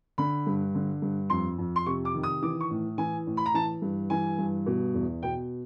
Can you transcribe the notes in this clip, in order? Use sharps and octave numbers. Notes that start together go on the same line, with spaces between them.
D3 B5
G2
D3
G2
F2 C6
F2
C6
C3 C#6
D6
D#3
D#6
E3 D6
C#6
A2
E3 G#5
A2
B5
A#5
E3 A5
G2
E3 G#5
G2
B2
E2
B2 G5